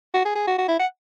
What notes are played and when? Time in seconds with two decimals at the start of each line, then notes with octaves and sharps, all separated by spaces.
0.14 F#4
0.25 G#4
0.35 G#4
0.47 F#4
0.58 F#4
0.68 E4
0.79 F#5